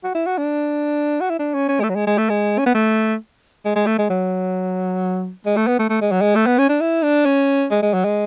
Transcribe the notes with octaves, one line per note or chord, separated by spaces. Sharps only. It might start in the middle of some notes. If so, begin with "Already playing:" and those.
F#4
E4
F#4
D4
F#4
E4
D4
C#4
C#4
G#3
A3
F#3
G#3
G#3
A3
G#3
C#4
B3
A3
G#3
G#3
A3
G#3
F#3
G#3
A3
B3
A3
A3
G#3
F#3
G#3
A3
B3
C#4
D4
E4
D4
C#4
G#3
G#3
F#3
G#3